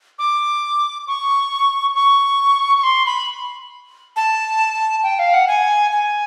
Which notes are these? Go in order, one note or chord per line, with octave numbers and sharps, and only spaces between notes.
D6
C#6
C#6
C#6
C6
B5
A5
G5
F5
F#5
G#5
G#5